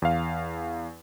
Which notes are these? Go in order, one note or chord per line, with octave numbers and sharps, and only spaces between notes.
E2 F5